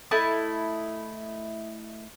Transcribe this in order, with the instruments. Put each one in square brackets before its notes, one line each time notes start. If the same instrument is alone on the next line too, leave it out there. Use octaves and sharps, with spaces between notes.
[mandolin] A3 E4 D#5 A5